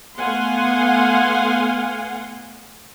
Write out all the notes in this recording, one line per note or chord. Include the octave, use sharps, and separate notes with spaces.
A3 B3 F5 F#5 G#5 C6